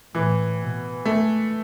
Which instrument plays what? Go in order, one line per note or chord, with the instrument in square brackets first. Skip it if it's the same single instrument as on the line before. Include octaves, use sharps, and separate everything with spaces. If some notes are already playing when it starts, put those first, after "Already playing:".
[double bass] A2 [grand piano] E3
[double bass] B2
[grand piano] A3